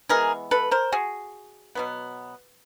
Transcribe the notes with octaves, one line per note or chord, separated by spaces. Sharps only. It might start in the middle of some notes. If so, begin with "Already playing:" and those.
E3 G#3 B3 G#4 A#4
A4 B4
A#4 C5
F#4 G#4
B2 F#3 B3